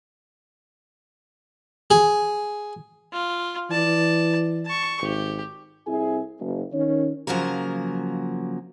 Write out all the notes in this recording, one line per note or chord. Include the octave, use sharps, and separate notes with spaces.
G#4
F4
E3 D5 A5
A5 C#6
G#1 G4
C2 C4 E4 G#4 E5 G#5
F#1
D#3 C#4 C#5
C#3 F3 F#3 A#3 A#4